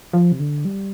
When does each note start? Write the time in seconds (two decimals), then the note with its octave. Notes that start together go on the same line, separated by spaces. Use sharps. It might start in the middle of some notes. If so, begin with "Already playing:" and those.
0.13 F3
0.32 C3
0.39 D3
0.65 G3